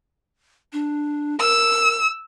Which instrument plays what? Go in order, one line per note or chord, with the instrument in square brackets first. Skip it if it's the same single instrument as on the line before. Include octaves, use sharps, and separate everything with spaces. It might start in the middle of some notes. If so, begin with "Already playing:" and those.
[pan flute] D4
[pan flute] A#4 [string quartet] E6